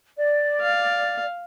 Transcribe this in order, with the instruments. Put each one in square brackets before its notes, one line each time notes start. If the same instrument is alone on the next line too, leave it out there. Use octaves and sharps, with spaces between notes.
[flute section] D5
[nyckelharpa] F5